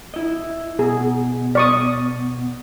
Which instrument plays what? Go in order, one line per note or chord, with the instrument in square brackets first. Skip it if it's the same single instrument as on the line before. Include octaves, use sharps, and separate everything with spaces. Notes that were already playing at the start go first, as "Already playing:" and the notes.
[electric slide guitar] E4 D#5
[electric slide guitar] B2 [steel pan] G#4
[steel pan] D5 C#6 D#6